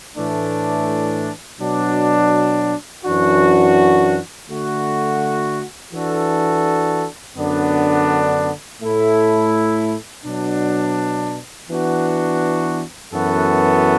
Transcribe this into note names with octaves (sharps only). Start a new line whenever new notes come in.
A2 E3 A3 D4
B2 F#3 D4
F#2 E3 D4 F#4
D3 A3 F#4
E3 D4 F#4 A4
F#2 D3 B3 D4
A2 A3 E4 A4
B2 F#3 D4
E3 B3 D4 F#4
F#2 E3 B3 F#4 A4